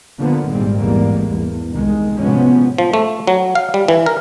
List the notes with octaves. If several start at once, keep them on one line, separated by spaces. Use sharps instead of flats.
D3 F3 A#3 B3
G#1 A#2 G3 G#3 C4
A1 E2 G#2 G3 G#3 A#3
E2
C2 D#3 G#3
A1 C3 F3 G#3 B3 C#4
F3
A3
F#3
F5
G3
E3
A#4